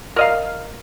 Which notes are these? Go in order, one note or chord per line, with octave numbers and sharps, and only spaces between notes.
A#4 D#5 F5